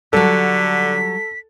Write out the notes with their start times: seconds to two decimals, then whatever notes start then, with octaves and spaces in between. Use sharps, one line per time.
0.13 D3 F#3 G3 A4 B6